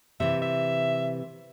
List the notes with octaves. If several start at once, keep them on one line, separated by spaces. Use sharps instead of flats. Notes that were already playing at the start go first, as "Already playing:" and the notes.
C3 E3 E5
E5